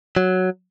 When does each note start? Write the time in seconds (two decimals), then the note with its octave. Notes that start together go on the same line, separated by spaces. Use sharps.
0.17 F#3